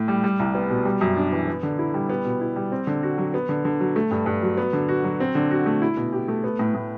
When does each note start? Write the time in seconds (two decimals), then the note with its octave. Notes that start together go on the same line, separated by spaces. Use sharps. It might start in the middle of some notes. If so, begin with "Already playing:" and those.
Already playing: A2
0.08 G3
0.24 G3
0.39 C2
0.55 B3
0.70 B2
0.85 G3
1.01 F#2
1.17 D4
1.32 E3
1.47 B3
1.63 D3
1.79 E4
1.94 G3
2.10 B3
2.25 B2
2.41 E4
2.56 G3
2.72 C4
2.87 D3
3.03 F#4
3.18 F#3
3.34 B3
3.49 D3
3.65 D3
3.80 F#3
3.96 A3
4.11 G2
4.26 G2
4.42 F#3
4.57 B3
4.73 D3
4.89 F#4
5.04 F#3
5.20 C4
5.35 D3
5.51 F#4
5.66 A3
5.82 E4
5.97 B2
6.13 G4
6.28 A3
6.44 B3
6.59 A2
6.75 A2